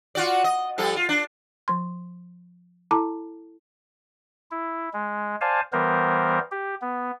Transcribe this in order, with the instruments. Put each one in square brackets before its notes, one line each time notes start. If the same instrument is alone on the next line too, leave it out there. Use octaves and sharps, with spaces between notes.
[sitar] F4 F#4 D5
D#5
F3 G3 A4
F4
D4
[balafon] F3 C6
E4 A4 A5 A#5 D6
[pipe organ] E4
G#3
C5 D5 F5 G#5 A5
E3 G3 B3 A#4 C5
G4
B3